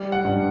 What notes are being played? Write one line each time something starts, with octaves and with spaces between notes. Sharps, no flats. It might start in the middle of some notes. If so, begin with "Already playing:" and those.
Already playing: G3
F#5
G2